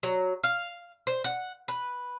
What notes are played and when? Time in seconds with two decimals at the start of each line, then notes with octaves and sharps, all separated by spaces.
0.03 F#3
0.43 F5
1.07 C5
1.24 F#5
1.68 B4